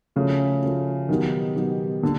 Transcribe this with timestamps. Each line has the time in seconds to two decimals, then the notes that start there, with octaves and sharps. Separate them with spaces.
0.16 C#3 F3 A3 C#4 F#4
0.62 F3 A3 C#4 F#4
1.09 B2 D#3 F#3 B3 D#4 G4
1.56 B2 F#3 B3 D#4 G4
2.03 A#2 D3